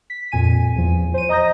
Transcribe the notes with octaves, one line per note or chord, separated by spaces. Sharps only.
B6
F2 A#2 G#5 D#7
E2 F3
C5 D#7
D#5 A#5 D#6 G6 A#6